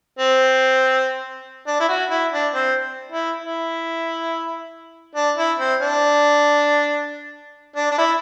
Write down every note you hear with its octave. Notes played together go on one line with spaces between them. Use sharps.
C4
D4
E4
F#4
E4
D4
C4
E4
E4
D4
E4
C4
D4
D4
D4
E4